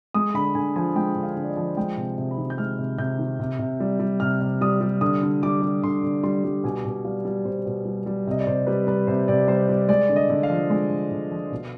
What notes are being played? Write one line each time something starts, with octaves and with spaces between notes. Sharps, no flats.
G#3 D#6
D3 B5
D3 G#5
F3 G#5
G#3 G5
D3
F5
D3
D5
D#5
F3
G#3 G5
C3
C3
B5
D#3
G6
G#3 F6
C3
C3 G6
D#3
C3
C3
G3
G3
C3 F6
C3
G3 D#6
G3
D3 D#6
D3
G3 D6
G3
D3 C6
D3
G3 C6
G3
B2 G#5
B2
G3 F5
G3 D5
B2 C5
B2
G3
G3
C3 D#5
D5
C3 C5
G3 B4
G3 B4
C3 C5
C3 D5
G3 C5
G3
G#3 D5
D3
D#5
D3
F5
F3
G#3
D3
D3
F3
B2